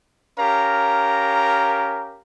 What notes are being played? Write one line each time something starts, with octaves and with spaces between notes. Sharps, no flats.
C#4 G4 A#4 F5 A#5